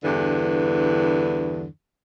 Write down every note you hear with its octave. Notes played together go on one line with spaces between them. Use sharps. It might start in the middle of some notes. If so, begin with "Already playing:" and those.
E2 G2 D3 E3